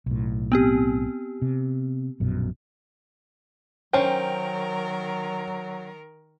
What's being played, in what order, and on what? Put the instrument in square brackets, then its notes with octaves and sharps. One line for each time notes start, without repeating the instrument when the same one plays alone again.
[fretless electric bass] B1 A2
[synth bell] B3 C4 G4
[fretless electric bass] C3
A#1 F#2 B2
[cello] D#3 A#4 [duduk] F#3 [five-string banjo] C#4 C5 [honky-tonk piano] G5